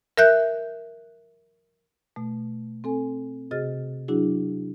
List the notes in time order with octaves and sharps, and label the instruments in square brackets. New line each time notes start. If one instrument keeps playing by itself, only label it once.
[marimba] A#4 E5 F#6 G6
B2 A3
C4 A4 G#5
C3 F#4 G#4 D#5 F6 A6
F#3 D4 E4 F#4 G#4